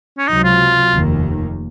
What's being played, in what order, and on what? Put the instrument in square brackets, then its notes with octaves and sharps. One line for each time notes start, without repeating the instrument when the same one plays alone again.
[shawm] C#4
[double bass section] C#2 C3 F#3 [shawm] D#4
[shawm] F4
[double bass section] F1 D#2 D#3 A#3